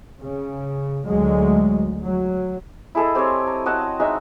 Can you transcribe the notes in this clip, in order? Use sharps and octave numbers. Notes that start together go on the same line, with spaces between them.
C#3
D2 F#3 G#3
F#3
E4 G#4 A4 D#5
C4 G4 C5 C#5
A#5
F#4 D#5 F#5 A5
F#5
G#3 D#4 F#4 E5